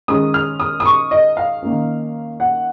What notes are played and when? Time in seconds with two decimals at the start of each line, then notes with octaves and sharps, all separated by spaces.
0.08 D#3 G#3 C#4 D#6
0.34 F6
0.60 D#6
0.80 D#6
0.85 C#6
1.11 D#5
1.37 F5
1.63 D#3 A#3 C#4
2.40 F#5